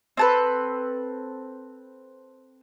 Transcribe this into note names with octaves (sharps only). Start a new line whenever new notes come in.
C4 A4 B4